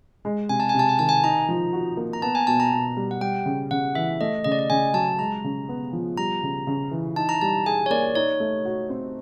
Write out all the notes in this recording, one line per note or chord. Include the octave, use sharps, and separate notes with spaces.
G#3
C3 G#5
A5
G#5
C3 A5
G#5
D#3 A5
G#5
D#4 A#5
F3
F#4
A#3
A#5
B3 A5
G#5
B2 A5
A#5
B2
G3
F#5
G3 G5
C#3
C#3 F#5
E3 E5
A3 D#5
C#3 D#5
D5
D#5
C#3 G#5
F#3 A5
G#3 A#5
C#3
B3
F3
G3 A#5
C#3
C#3
E3
D#4 A5
A#5
G3 A5
G#4 G#5
C#5
A#3 D5
D#4 C#5
A3
F#4
C4